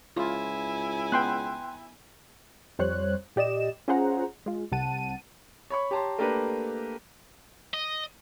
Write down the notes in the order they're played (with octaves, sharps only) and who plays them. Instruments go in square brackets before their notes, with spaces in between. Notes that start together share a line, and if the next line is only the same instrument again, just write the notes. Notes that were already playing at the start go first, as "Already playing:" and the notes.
[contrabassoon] C#2 [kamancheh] E4 G#5 [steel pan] F4
[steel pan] B3 [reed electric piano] G5 C6 F#6
[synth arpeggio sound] F2 G3 C5 C#5 F#6
A#2 G4 D5 D#5 E7
C#4 F4 G#4 C5 F#5 A#5
G#3 F4
C2 C3 F#5 A5 D#7
[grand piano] C#5 B5 C#6
G4 C#5 A5 A#5 C6
A3 A#3 D4 G4 A#4 B4
[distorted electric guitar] D#5